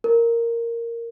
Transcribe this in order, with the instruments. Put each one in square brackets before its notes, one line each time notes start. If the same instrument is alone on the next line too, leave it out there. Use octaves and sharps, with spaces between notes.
[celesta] A#4